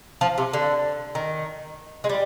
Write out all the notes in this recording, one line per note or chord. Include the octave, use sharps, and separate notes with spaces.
F3
C3
D3
D#3
G#3
G3